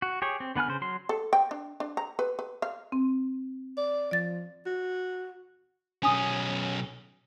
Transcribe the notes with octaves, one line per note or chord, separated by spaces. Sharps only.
F#4
G4 G#4 C#5
C4
D3 B3 B4 G#5 F6
C#3 C5
F#3 C6
A4
G5
D4
D4
A#5
B4
B4
F5
C4
D5
F3 D5 A6
F#4
B1 C#4 G#5 D#6